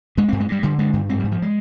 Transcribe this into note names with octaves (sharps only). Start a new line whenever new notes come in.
G2 G#3
G2 C4
G#3
G2 G3
D3 G3
G2 G#3
G2
G#2 C4
G#2 G3
F3
G#3